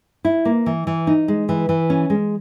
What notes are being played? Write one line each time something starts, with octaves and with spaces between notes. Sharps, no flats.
E4
A#3
E3
E3
D#4
G#3
E3
E3
C#4
G#3